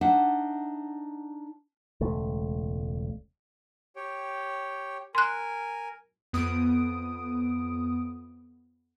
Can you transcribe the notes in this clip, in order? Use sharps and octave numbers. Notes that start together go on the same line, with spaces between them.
D4 D#4 E5 F#5
E1 C#2 A3
G4 C#5 G5
A#4 G#5 C6 F#6
F2 B3 D#6 D7